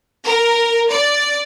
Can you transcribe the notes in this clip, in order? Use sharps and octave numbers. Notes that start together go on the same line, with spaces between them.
A#4
D5